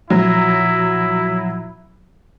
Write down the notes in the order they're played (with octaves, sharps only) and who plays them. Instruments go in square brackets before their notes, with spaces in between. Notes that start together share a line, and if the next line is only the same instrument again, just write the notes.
[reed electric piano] A#2 F3 [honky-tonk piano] F#3 [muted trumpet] E4